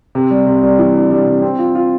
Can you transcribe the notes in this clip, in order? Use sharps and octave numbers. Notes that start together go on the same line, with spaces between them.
C3
G3
C3
G3
E3
D4
G3
C3
C4
F4
F4